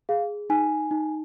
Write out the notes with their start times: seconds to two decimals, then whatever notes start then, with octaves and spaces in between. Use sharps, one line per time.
0.09 G#4 F5
0.50 D#4 G#5
0.91 D#4